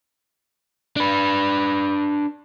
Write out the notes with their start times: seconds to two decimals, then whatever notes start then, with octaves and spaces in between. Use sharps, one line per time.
0.96 D4 B4